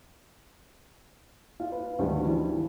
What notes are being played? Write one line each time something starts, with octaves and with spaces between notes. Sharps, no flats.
F4 F5
B4
D2 G#2 D#3 G3
E3 F3 E4